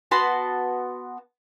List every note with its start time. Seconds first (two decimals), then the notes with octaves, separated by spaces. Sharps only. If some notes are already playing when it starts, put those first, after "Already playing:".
0.11 B3 F#4 A5 C6